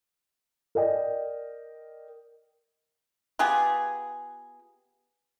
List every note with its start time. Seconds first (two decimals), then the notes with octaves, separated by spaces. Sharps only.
0.75 A#4 D5 D#5 G5
3.39 B3 F4 G4 G#4